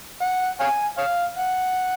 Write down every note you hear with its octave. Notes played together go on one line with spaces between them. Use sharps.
F#5
C#5 F5 G#5
C#5 F5
F#5